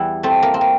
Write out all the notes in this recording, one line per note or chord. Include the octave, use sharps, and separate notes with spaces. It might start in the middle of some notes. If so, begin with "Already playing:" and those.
Already playing: E2 E3 G3 E4
A3 C4
A#3
C4
A#3